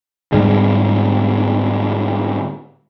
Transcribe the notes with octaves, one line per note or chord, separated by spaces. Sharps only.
G#2 D3 G3 G#3